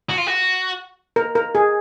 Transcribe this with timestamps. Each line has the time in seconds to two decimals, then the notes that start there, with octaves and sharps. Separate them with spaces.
0.09 F#4
0.18 F4
0.27 F#4
1.16 A#4
1.35 A#4
1.55 G#4